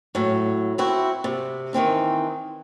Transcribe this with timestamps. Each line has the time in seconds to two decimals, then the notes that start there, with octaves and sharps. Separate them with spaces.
0.15 A2 F#3
0.78 C4 E4 F#4
1.24 C3
1.73 D#3 E3 C4 D#4